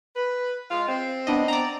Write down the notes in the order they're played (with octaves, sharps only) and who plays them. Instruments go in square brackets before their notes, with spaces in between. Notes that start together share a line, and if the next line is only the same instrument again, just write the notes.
[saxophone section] B4
G#3 F4
C4
[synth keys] B3 D4 D#5
D5 A#5